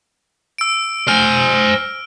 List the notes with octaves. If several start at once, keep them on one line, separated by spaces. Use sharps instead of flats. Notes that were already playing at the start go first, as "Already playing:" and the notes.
E6 D7
C5 G#5 F6